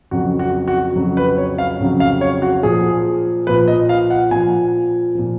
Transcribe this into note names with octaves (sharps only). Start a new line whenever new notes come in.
F2 C#3 F#3 F#4
F#4
F#4
F2 C#3 F#3
B4
C#5
F5
F2 C#3 F#3
F5
C#5
F#4
A#2 F3 G#4
A#2 F3 B4
D#5
F5
F#5
A#2 F3 G#5
A#2 F3